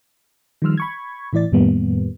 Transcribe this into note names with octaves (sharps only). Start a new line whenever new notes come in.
D#3 F3 G3 C6 E6 F6
B5 C#6 G#6
A2 E3 E4 D5 A6
F2 A2 D#3 G3 A#3 B3